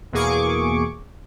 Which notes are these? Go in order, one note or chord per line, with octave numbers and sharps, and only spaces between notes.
E2 B2 A#3 G#4 C#6 D6